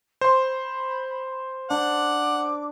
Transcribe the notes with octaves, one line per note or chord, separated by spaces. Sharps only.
C5 B5 C6
D4 F#5 D6